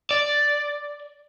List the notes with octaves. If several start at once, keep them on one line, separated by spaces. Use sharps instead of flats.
D5